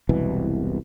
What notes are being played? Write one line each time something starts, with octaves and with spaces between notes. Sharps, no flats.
E1 C2 B2 E3